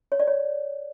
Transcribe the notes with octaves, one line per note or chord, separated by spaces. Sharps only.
C#5
D5
C#5